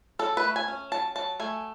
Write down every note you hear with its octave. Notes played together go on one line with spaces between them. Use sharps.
F#3 A4
B4
A3
G#5
C#4
F#3 A5
F#3 A5
A3 G#5